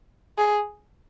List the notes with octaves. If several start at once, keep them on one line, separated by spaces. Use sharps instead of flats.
G#4